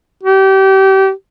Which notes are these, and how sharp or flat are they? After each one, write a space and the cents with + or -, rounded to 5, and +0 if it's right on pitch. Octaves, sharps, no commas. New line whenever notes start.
G4 -30